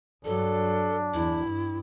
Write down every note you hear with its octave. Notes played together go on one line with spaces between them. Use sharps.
G2 F#3 D4 A4
E2 E4
G2